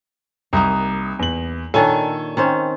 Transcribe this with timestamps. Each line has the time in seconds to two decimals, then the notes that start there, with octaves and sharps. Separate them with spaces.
0.53 C2 A#3 D#4 D#6
1.19 E2 F#7
1.74 A#2 D#3 D4 A4 C#5 G#5
2.37 D#3 C4 C#4